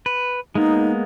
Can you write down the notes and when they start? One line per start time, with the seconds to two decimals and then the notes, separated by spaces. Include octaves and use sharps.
0.06 B4
0.55 G#3 A#3 B3 D#4